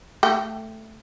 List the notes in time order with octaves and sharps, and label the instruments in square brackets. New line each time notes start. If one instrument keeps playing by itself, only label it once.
[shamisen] A3 G5